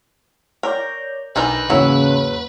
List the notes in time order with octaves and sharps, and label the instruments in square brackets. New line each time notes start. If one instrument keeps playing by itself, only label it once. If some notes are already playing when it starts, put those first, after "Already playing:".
[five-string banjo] A#4 [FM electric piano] C#5 D5 G6
[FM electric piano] B1 G#5 E6 [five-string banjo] D4 D#4 A#4 [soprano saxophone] B4
[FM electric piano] E2 G#2 A#3 [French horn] C#3 [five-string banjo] F#3 E4